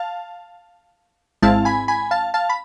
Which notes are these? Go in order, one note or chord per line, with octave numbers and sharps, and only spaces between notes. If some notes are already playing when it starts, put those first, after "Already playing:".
Already playing: F5 A5
G#1 G#2 G#3 C4 E4 F5 A5
G#5 B5
G#5 B5
F5 A5
F5 A5
B5